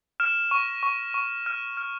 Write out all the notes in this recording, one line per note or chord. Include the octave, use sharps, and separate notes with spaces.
F6 E7
C#6
C#6
C#6
F6
F6